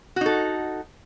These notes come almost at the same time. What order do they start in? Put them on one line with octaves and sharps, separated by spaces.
F#4 D#4 A4